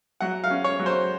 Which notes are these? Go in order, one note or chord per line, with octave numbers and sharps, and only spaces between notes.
F#3 F#5
F5
C#4
C#5
F#3
C5